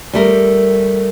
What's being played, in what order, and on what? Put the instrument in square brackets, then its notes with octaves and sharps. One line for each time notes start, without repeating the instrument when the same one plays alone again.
[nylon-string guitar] G3 A3 A#4